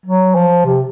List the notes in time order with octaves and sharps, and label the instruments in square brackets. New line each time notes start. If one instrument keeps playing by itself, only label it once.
[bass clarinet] F#3
F3
C3